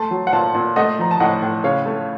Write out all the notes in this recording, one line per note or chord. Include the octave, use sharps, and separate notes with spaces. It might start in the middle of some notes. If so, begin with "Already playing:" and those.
Already playing: A3 A5 C6
F#3
F#5
A#2 F5 A5
A#2
A3 D#5 F#5
F3 A#5
A5
A2 D#5 F#5
A2
C#3 C#5 F5
A3